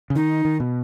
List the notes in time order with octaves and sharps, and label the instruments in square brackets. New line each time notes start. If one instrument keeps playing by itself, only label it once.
[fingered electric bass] C#3
[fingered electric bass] D#3 [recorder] D#4
[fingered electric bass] D#3
B2